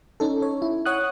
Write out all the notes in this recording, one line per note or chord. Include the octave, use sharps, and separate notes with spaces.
C#4 D#4 A4
C#5
E4
C#5 F#5 D#6 F#6